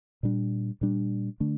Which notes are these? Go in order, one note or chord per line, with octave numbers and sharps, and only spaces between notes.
A#2 G3 D4
A#2 G3 D4
D3 A3 D4